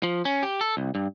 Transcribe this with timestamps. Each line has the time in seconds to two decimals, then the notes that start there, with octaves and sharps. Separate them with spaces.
0.03 F3
0.25 C#4
0.43 G4
0.61 A4
0.77 C2
0.95 G2